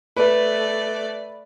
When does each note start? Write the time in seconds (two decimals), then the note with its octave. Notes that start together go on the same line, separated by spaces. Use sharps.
0.16 A3 B4 D5